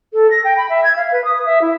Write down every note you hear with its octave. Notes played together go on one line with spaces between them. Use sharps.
A4
A#6
G5
B5
E5
G#6
F5
B4
D#6
E5
E4